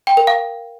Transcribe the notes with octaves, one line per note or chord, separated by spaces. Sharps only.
G5
A#4
F5